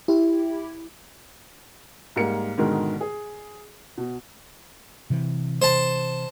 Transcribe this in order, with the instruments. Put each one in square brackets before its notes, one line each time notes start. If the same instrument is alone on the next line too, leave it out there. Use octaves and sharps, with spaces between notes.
[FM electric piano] E4 G4
[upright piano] G#2 G3 A#3 A#4 C#7
G#2 B2 D3 D#3 G#3 A#4
G#4
B2
[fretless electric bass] C3 E3
[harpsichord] C5 A5